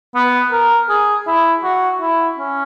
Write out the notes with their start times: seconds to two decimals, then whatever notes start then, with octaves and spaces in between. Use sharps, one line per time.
0.15 B3
0.52 A#4
0.89 G#4
1.27 E4
1.64 F#4
2.01 E4
2.38 C#4